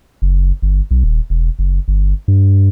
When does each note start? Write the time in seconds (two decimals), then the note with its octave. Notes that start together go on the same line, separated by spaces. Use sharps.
0.22 F#1
0.62 G1
0.91 B1
1.03 D#1
1.30 E1
1.59 F#1
1.88 G1
2.28 G2